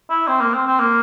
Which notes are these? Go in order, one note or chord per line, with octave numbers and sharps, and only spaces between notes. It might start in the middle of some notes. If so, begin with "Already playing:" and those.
E4
C4
A#3
C4
C4
A#3